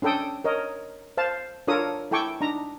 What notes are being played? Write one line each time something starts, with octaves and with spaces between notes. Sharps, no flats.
C#4 D4 A4 G5 D#6
A#4 C#5 D#5
C5 F5 A5
D4 F4 A4 A#4 C#5 D#6
E4 A4 G5 G#5 C#6 D6
D4 D#4 A#5